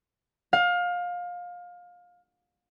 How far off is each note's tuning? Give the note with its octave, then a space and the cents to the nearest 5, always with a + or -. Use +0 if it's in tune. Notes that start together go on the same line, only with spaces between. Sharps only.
F5 +25